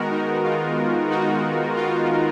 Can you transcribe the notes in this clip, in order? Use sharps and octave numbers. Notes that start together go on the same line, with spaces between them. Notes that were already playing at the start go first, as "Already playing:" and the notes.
Already playing: D#3 G#3 B3 F#4 A#4
D#4
F4
D#4 F#4
F4